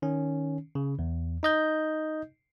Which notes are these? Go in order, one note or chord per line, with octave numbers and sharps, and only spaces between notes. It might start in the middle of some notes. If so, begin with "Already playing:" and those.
D#3 C#4
C#3
E2
D#4 D#5 G6